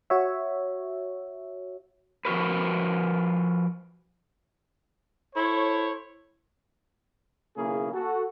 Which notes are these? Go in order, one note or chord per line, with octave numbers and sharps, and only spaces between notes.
F#4 C#5 E5
F3 F#4 A#4 B4
E4 A4 C5 C#5
B1 C#3 A#3 E4 G#4
F#4 A4